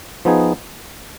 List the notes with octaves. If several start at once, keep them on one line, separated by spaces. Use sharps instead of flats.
F3 B3 D#4 G#4